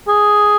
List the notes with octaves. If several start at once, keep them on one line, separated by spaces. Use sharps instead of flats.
G#4